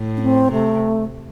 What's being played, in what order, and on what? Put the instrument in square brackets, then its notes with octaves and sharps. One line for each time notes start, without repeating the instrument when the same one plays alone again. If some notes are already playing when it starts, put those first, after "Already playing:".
Already playing: [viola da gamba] A2
[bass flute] C#4
C4
[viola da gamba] C3 [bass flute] A3